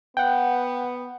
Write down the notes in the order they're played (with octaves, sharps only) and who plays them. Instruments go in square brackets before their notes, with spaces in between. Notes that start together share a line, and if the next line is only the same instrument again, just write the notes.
[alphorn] B3 [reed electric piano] F#5 G5